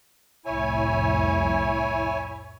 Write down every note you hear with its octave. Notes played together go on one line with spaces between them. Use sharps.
C2 F2 A2 E4 C#5 G#5